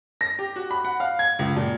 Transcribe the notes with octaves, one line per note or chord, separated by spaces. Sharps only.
A#6
G4
F#4
B5
F#5
F5
G#6
C#2
A#2